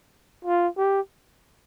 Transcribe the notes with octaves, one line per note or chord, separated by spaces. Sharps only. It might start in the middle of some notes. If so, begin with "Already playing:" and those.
F4
G4